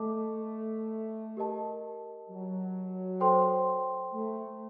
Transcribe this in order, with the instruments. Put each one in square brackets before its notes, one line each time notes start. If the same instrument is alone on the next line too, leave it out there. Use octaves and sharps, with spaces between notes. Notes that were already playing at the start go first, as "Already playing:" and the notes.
Already playing: [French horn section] A3 [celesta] A4 D#5 A5 D6
[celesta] G4 A#4 D#5 A5
[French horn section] F#3
[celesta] A4 C5 G5 C6
[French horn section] A3